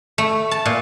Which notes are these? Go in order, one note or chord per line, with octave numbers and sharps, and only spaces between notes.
A3
A5
A#2